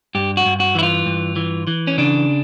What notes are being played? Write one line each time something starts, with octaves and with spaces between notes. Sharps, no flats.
G2 G4
F#4
G2
F#4
E3 E4
F4
G2
E3
E3
C#4
C#3 D4